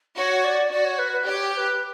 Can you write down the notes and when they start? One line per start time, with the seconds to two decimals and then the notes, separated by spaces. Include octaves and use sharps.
0.17 F#4 C#5
0.44 D5
0.71 F#4 D5
0.85 C#5
0.98 B4
1.13 B4
1.26 G4 D5
1.29 C#5
1.53 C#5
1.57 B4